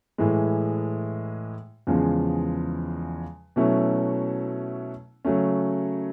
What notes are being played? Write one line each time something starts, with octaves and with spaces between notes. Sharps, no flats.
A2 E3 G#3
E2 C#3 F3 G#3
B2 F#3 A3 C#4 E4
C#3 F#3 A3 C#4